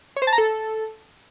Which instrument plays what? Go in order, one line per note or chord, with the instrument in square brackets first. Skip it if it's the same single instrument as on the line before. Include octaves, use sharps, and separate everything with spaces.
[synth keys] C#5
C5
A5
A#5
A4